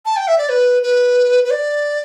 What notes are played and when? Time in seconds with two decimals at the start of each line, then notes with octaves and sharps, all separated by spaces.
0.05 A5
0.16 G5
0.28 E5
0.38 D5
0.49 B4
0.83 B4
1.44 B4
1.51 D5